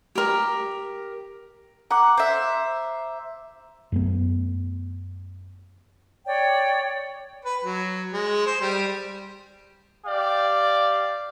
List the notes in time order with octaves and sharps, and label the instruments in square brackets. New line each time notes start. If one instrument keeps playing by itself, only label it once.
[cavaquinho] G4 A#4
[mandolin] F#5 [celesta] A#5 D6
[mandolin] C5 E5
[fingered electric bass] F#2 A3 B3
[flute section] C#5 D5 G5
[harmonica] B4
F#3
G#3
C5
G3
[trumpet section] G4 D5 F5